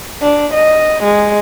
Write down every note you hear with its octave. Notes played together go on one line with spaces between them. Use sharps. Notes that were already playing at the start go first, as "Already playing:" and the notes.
D4
D#5
G#3